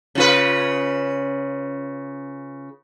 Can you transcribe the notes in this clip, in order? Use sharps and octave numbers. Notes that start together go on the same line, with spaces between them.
C#3 F4 B4